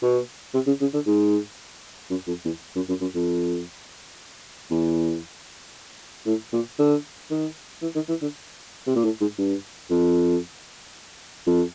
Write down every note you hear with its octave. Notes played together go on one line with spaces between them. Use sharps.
B2
C3
C#3
C#3
D3
G#2
F#2
F2
E2
F#2
F#2
F#2
F2
E2
A2
A#2
D3
D#3
E3
D#3
E3
D3
C3
A#2
A2
G#2
G2
F2
F2